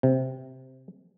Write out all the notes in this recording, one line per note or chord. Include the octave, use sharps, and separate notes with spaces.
C3